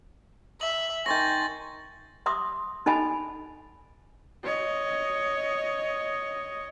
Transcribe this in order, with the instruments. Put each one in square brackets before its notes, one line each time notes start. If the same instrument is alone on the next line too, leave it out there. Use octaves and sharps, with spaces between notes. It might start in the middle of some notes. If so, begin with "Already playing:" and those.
[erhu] E5 [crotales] F#7
[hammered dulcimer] D#3 C6 C#6 [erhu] G#5 [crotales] G6 A6 A#6
[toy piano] E5 C6 D6 D#6
D#4 A4 D#5 G#5 B5
[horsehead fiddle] C#5 D#5